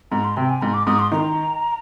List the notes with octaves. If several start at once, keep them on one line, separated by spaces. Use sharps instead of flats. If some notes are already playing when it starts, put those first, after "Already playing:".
G#2 A#5
C6
C3 G5
G#5
G#2 C6
D6
G#2 D#6
C6
D#3 A#5